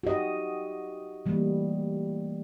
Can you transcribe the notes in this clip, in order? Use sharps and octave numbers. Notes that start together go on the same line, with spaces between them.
F#4 G4 D#5
E3 G3 A3 A#3